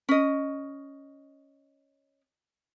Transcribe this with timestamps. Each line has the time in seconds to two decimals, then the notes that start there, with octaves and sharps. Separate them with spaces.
0.09 C#4 D#5